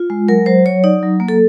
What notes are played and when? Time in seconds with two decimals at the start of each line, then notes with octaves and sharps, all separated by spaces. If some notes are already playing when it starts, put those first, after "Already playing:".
Already playing: F4
0.10 G#3
0.28 F#3 A#4
0.46 F#3 C5
0.66 F#3 C#5
0.84 D#4 D5
1.03 F#3
1.20 A#3
1.28 A4